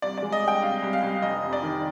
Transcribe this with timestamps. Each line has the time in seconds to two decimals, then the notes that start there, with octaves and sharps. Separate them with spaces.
0.02 C2 D5
0.18 G#3 D5
0.32 D#5
0.43 C2
0.48 G5
0.62 C2 F5
0.83 C2
0.93 F5
1.03 C2
1.22 F1 D#5
1.42 F2
1.53 D5
1.62 D#3